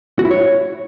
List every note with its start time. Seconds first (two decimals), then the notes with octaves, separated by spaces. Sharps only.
0.19 F#4
0.25 E4
0.31 C#5